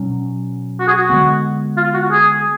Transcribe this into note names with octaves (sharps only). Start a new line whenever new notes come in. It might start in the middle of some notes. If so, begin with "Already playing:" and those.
Already playing: B2 F#3 C#4
F#4
G#4
F#4
D3 G#3 B3
F4
F#4
G#4